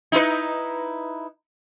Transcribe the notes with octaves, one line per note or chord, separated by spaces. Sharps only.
D#4 E4 B4